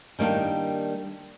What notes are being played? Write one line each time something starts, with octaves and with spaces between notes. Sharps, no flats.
D#3 G3 A#3 D4